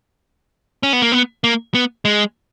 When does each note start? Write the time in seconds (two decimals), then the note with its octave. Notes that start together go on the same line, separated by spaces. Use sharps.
0.83 C#4
0.93 B3
1.02 A#3
1.12 B3
1.44 A#3
1.75 B3
2.05 G#3